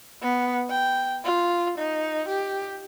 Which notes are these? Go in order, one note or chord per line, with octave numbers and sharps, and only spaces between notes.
B3
G5
F4
D#4
G4